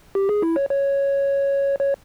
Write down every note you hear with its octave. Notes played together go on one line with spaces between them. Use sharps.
G4
G#4
E4
C#5
C#5
C#5